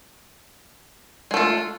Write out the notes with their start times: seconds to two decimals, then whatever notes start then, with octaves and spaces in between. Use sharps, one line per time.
1.31 G#3
1.34 A3
1.37 F4